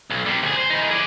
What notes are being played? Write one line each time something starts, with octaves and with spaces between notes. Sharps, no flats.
B1
C3 G3
D2 G#4
C5
E3 D#4
G#4 D5